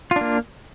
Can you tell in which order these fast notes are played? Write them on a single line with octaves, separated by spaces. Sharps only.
F4 D4 A#3